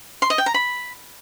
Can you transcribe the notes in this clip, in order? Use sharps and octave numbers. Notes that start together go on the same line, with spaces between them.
C6
D#5
G5
A#5
B5